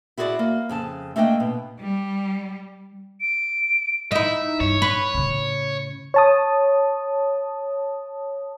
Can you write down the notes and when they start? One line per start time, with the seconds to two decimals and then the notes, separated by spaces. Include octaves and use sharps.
0.18 E4 F#4 G#4 A#4 D5
0.39 A#3
0.69 F2 C#3 A5
1.16 A3 A#3 D4 D#5 G5
1.40 B2
1.80 G3
3.21 D7
4.12 D#4 E4 E5
4.60 G2 C#5
4.82 B4
5.14 A2 C#3
6.14 C#5 A5 D#6